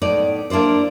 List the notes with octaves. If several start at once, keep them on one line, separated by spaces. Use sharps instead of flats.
A2 B3 D#4 D5
A#3 D4 E4 C5 D5